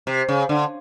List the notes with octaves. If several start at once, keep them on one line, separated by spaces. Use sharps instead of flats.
C3
C#3
D3